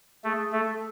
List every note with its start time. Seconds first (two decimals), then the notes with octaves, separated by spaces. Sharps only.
0.24 A3 G#4
0.52 A3 A4